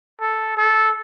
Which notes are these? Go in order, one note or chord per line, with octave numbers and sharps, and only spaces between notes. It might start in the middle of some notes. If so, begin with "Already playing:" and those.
A4
A4